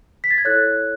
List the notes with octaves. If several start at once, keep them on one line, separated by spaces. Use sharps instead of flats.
B6
A6
G#6
E4 A4 C#5 F#6